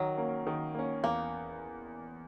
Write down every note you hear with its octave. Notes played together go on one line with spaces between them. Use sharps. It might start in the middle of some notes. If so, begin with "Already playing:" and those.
Already playing: D#3 F#3
A#3 C#4
D#3
A#3 C#4
E2 A#3